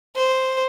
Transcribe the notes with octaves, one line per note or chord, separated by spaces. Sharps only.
C5